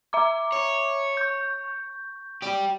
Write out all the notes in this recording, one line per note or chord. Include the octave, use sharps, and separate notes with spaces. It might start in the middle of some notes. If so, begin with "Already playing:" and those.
E5 A#5 D6
C#5
C#6 G6
G4 D5